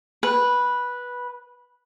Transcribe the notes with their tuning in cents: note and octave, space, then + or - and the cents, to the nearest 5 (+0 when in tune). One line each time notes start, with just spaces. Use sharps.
B4 -10